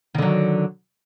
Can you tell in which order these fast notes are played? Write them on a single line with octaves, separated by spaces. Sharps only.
D#3 D3 F#3